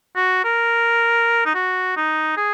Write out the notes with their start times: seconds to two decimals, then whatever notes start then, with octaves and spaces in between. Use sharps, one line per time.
0.16 F#4
0.44 A#4
1.45 D#4
1.55 F#4
1.97 D#4
2.37 G#4